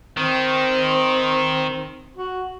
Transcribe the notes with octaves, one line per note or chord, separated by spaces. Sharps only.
D#3 C4
F#4